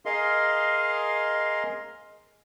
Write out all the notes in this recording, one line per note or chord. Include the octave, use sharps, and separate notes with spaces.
G#4 A#4 D#5 F5 C6